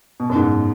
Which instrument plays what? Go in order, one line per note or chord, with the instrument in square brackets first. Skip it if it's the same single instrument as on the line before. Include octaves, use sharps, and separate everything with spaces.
[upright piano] B2
F#2
G#2